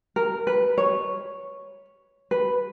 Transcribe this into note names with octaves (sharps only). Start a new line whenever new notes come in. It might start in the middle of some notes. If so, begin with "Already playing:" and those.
A#4
B4
C#5
B4